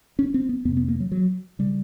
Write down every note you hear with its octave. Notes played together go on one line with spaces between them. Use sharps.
C#4
C4
B3
F2 C3 B3
B3
A#3
F#3
F#3
C#3 G3